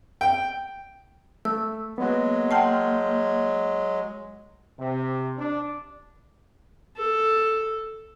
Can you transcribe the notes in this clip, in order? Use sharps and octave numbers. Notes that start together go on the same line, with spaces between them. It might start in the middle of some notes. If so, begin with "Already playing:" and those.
G5
A3 E6
F#3 G#3 A#3 B3 F#4
F#5 G5 A5 C6 F6 G6
C3
D4
A4